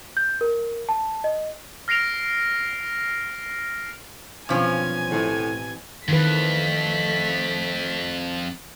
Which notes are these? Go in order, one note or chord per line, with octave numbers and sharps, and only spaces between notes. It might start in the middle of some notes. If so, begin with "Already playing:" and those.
G6
A#4
A5
D#5
F6 A#6 C7 D7 F7
B1 G2 F3 C4 C#4 G#5 C7
A1 A2
F2 D#3 E3 A3 B4 B6